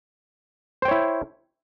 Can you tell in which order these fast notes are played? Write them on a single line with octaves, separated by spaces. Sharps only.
C5 G5 C#5 E4